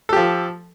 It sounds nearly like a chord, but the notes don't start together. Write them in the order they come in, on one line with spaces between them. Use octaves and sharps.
A4 G4 F3